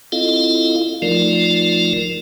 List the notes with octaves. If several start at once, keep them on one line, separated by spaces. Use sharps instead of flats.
C4 E4 F4 A4 D#5 F5
F3 A3 D#4 F4 A#4 D5